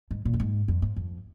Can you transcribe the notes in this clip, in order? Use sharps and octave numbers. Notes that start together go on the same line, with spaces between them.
G#2
A#2
F2
G#2
F2
G#2
F2